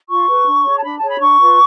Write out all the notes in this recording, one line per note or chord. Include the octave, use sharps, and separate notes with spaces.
F4 C#6
G#4 B4
D4
G#4 C#5
A5
D4 B5
A5
G#4 C#5
B5
D4 C#6
F4 B4